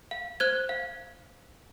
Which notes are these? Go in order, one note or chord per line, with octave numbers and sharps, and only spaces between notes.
F5
C5 F#6 G#6
F5